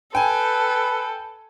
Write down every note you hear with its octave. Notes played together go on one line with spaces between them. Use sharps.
A4 B4 G5 G#5